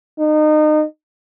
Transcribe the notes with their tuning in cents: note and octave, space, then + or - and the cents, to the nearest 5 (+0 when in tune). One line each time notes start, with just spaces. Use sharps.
D#4 -30